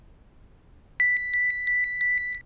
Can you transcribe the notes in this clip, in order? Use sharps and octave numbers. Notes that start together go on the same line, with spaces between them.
B6